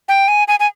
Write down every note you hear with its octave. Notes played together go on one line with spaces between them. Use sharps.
G5
G#5
G#5
G#5